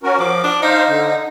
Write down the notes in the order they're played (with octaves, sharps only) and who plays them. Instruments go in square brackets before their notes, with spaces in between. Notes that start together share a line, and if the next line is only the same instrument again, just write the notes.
[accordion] C#4 F#4 A#4
[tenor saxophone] F3 [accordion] D6
[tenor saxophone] D4
[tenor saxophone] D#4 [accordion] C5 F5
[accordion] D3